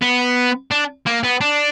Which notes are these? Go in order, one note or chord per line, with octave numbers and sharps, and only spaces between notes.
B3
D4
A#3
B3
D4